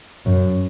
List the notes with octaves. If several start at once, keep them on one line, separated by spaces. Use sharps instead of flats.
F#2